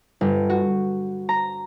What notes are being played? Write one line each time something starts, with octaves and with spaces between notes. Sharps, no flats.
G1
F#4
A#5